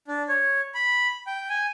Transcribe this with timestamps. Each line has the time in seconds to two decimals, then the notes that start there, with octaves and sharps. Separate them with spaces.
0.08 D4
0.29 C#5
0.74 B5
1.27 G5
1.49 G#5